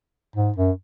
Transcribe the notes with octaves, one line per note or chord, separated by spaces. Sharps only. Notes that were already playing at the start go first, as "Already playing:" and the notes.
G#2
F#2